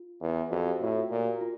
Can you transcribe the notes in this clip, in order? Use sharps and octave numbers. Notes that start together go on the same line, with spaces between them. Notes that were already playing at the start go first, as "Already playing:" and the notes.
Already playing: F4
E2
F2 F#4
G4
A2 F#4
F4
A#2 F4
G4
F#4
F4